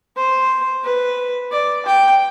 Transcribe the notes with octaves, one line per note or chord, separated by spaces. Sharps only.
C5
B4
D5
G5